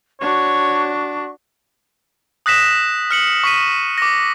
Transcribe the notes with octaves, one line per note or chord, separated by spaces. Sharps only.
D4 F#4 C#5 C#6
D#6 F#6 A#6 B6 E7
F6 C#7 F#7
C#6 B6 D#7
D6 A#6